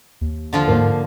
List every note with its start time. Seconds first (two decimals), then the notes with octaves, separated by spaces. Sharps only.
0.21 D#2
0.53 D3 F3 F4
0.68 G#2 A#3 C5